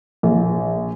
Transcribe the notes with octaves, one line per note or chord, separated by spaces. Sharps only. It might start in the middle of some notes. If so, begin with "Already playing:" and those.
A#1